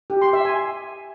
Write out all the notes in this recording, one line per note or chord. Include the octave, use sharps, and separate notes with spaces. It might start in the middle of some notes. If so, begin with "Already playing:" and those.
G4
C6
E5
G#5